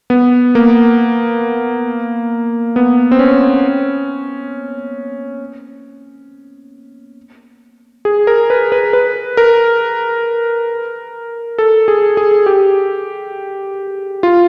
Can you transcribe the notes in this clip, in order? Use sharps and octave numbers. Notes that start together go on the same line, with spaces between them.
B3
A#3
B3
C4
C#4
G#4
A#4
B4
B4
B4
A#4
A4
G#4
G#4
G4
F4